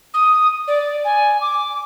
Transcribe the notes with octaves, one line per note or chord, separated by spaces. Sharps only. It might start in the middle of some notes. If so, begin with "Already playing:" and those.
D#6
D5
G#5
D6